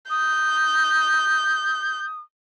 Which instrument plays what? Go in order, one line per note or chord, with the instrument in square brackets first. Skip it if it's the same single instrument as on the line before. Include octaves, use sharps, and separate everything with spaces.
[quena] D#6 [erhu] G6